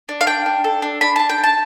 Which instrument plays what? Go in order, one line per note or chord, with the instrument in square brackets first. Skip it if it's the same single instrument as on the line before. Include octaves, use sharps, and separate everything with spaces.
[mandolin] D4
F5
D4 G5
D4
A4
D4
D4 B5
D4 A5
G5
D4
A5